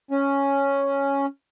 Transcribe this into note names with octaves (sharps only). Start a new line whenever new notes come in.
C#4